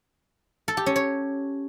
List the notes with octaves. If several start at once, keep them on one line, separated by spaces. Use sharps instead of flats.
A4
G4
C#4
C#5